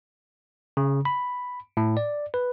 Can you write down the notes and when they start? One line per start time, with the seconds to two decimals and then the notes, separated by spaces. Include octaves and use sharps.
0.77 C#3
1.05 B5
1.77 A2
1.97 D5
2.34 B4